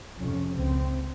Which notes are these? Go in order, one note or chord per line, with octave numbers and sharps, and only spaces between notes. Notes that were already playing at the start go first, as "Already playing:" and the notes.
F2 C3 C#4
C#2 C#3 C4